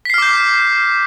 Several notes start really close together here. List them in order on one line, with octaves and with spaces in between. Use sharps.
B6 C7 F6 D6 G6